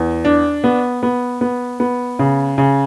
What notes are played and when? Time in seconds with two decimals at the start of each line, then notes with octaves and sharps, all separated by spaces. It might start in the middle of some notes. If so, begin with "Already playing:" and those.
Already playing: E2
0.25 D4
0.64 B3
1.03 B3
1.41 B3
1.80 B3
2.19 C#3
2.58 C#3